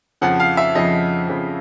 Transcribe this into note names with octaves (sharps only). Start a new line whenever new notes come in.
F2 C#3 F3 F#5
F5
E5
F2 C#3 F3 D#5
F2 C#3 F3